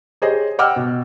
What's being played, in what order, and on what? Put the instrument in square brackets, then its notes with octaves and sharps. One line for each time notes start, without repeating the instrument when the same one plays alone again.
[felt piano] G4 G#4 C5 C#5 D#5
D#5 F#5 G5 D6 E6 F6
B2